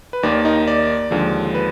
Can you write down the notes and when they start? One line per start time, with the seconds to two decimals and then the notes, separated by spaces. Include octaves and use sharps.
0.13 B4
0.23 D#2 D#3 A#3 D5
0.45 D#4 D#5
0.68 D5
1.10 D#2 D3 F3 G#3
1.55 B4